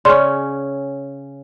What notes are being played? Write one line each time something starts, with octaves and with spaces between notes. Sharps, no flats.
C#3 C#4 D5 C6